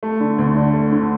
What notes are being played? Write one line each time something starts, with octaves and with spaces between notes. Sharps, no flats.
A3
D3
D2
D4
A3
D3